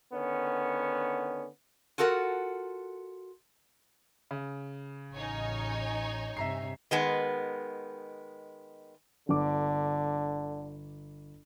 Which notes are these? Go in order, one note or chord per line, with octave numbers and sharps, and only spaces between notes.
D3 D#3 B3 C#4
F4 F#4 A4 A#4 E5 F#5
C#3
A1 D#4 C#5 G#5
G2 C3 E5 A#5 C7
D#3 G#3 B3
G1 D3 D6